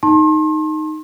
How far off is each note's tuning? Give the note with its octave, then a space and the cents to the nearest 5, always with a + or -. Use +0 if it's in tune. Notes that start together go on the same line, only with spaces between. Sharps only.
D#4 +0 A5 +0 C6 +40